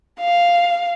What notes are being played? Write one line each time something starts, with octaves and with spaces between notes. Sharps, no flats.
F5